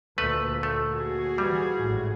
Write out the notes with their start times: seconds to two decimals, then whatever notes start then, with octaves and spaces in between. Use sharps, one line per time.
0.18 D2 A#2 A3 A#3 B4
0.63 A3
0.92 F#4 G#4
1.38 E3 F3 G3
1.78 G#1 A2